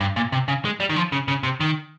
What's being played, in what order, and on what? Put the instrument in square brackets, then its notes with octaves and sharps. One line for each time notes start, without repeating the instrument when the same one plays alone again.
[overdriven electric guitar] G2
A#2
C3
C#3
G#3
G3
D#3
F3
C#3
C#3
C3
D#3